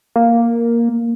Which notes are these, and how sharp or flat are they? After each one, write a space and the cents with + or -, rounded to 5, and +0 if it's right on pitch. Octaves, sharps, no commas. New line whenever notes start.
A#3 +0